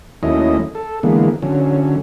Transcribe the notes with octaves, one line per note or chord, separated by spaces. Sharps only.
D#2 F#3 A3 C#4 E4 D#5
A4
D3 E3 G#3 A#3 B3
D3 F#3 C#4